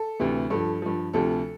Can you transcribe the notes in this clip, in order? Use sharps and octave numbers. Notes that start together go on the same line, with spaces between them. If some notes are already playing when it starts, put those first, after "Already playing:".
Already playing: A4
D2 C3 E3
G2 F3 A4
G2 F3
D2 C3 F3 A4